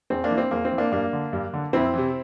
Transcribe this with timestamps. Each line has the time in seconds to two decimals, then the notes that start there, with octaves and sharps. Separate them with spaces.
0.10 E2 C4
0.24 A#3 D4
0.30 E3
0.38 C4
0.51 E2 A#3
0.65 C4
0.72 E3
0.78 A#3 D4
0.92 G2 A#3 D4
1.13 D3
1.33 G2
1.54 D3
1.73 F2 C4 E4
1.94 C3 E3